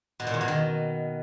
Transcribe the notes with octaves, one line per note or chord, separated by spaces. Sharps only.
B2
A#2
E2
B2
D#3